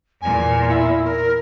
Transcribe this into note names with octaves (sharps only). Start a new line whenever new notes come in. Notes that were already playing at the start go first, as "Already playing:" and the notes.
E2 A#2 G#5
E4
A#4